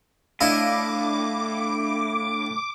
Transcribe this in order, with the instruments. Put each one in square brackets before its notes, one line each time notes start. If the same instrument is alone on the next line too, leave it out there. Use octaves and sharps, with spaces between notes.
[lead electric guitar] A2 [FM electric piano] D4 F5 [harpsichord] E4 D#5 [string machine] D6